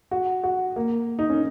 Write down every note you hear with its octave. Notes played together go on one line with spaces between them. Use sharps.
F#4
F#4
A#3
D#4
C#4